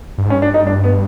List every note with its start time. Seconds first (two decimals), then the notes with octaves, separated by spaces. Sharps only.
0.18 G2
0.26 G#2
0.30 C#4
0.34 G2
0.42 D4
0.54 D#4
0.67 D4
0.84 B3